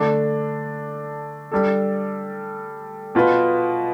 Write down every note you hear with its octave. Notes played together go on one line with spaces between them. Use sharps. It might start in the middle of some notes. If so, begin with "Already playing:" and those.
Already playing: D3 A3 D4
G3 D4 A4
B2 B3 F4 B4